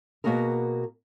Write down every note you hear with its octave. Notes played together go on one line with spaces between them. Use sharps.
B2 D#3 A#3 F#4 G#4 A#4